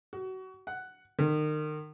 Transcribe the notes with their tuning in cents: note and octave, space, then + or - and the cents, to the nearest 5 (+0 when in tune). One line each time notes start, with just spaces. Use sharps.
F#4 +25
F#5 +10
D#3 -30